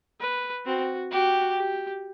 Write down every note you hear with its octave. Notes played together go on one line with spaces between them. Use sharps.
B4
C4 F#4
F#4 G4
G4